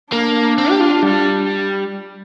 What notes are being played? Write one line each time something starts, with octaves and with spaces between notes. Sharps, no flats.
A#3 D4
C4
G4
F4
G3